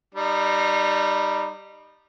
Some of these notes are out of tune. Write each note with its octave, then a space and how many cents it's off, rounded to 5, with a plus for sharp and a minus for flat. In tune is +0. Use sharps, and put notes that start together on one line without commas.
G3 +0 D#4 -25